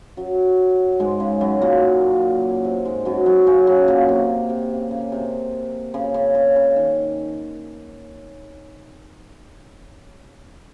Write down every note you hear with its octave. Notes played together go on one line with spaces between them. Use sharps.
F#2 F#3
G#2 G#3
C#3
F#2 F#3
A#2 A#3
C3 C4
G#2 G#3
F#2 F#3
F#2 F#3
C#3 C#4
C#3 C#4
A#2 A#3
C3
C3
C#3
C#3
C3
C#3
C#3
C#3
C#3
D#3